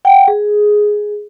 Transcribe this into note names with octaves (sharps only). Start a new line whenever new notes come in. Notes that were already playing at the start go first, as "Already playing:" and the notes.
F#5 G5
G#4